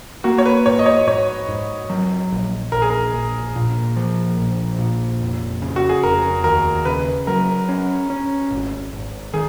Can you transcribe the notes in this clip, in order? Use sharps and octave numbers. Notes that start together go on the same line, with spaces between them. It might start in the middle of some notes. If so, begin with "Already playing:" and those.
A#3 F#4
C#5
B4
G#2 C#5
D#5
C#5
G#2 C#5
G#2
F#3
A#1
A#1 A#4
G#4
A#4
A#1
A#2
F3
A#1
A#2
F1
C#3
F#4
G#4
F1 A#4
D#2 A#4
C#3 B4
F#3 A#4
C#4
C#4
G#1
G#1
D#3 G#4